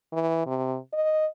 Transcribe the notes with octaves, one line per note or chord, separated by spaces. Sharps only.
E3
C3
D#5